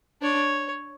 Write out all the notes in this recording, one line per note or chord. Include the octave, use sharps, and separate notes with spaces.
D4 C#5